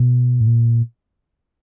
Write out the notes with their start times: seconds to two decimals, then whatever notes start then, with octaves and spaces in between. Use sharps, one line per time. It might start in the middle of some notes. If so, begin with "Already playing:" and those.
Already playing: B2
0.41 A2
0.47 A#2